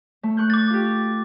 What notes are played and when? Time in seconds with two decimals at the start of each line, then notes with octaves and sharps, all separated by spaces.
0.23 A3
0.37 C#6 F#6 G6
0.50 D6 A6
0.70 F4 G4